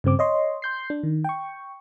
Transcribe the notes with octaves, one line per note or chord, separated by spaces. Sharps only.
G2 C#3 C4 D6
C#5 D#5 C6
C6 G6 C7
D4
D#3
G5 C#6